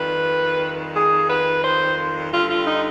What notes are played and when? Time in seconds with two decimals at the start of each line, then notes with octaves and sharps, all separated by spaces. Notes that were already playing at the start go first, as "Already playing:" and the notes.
Already playing: F2 D#3 G3 B4
0.94 G#4
1.29 B4
1.63 C5
2.31 G2 D3 G3 F4
2.48 F4
2.65 D#4